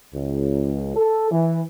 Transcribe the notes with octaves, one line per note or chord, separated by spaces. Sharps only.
C#2
A4
E3